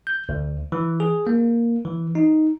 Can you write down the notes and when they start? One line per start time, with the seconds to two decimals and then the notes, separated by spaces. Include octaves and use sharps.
0.07 G6
0.29 D2
0.72 E3
1.00 G#4
1.27 A#3
1.85 E3
2.15 D#4